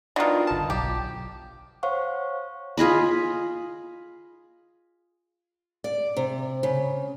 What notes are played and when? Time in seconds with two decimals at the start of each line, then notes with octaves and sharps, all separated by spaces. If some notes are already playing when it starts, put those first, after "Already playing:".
0.16 B2 D#3 D4 F4 A#4
0.47 G1 A5
0.70 B1 G4
1.83 C5 C#5 F5 F#5 C#6
2.77 F4 G#4 D#5 B5
5.84 D5
6.17 C3
6.63 C#3